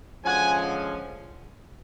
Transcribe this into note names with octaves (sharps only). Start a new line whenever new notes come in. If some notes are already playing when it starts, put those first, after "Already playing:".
D3 F3 G#3 C#4 F#5 G#5